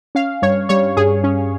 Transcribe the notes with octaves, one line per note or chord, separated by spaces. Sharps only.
C#4 F5
G2 C#5
G3 C#5
G2 G#4
C#4